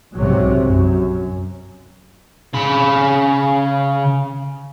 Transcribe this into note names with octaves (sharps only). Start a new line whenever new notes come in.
B1 G#2 C3 F#3
F#2
C#3 B5